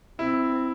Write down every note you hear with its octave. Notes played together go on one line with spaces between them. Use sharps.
C4 E4